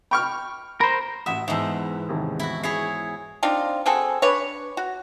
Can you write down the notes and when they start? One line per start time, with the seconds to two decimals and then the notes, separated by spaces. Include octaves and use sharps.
0.11 G5 B5 C#6 F6
0.81 A#4 C5 B5
1.26 A1 E5 F#5 D#6
1.48 E2 G#2 E5 A5 E6
2.09 D#2 C3 D#3
2.39 E4 F#4
2.63 E4 G#4 C#5 C7
3.43 C4 D4 D#4 F4
3.86 F#3 C4 G#4 A4
4.22 D4 B4 C#5
4.77 F#4